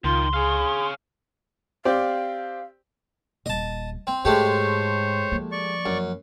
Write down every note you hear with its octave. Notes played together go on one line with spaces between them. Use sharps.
C#2 D#3 F4 C6
G#4 C#5 F5
C4 G4 D5 F5
D#1 D#5 A5
C4
G#2 G#3 A3 G4 C5 C#5
F3 A#3
D5 C#6
F#2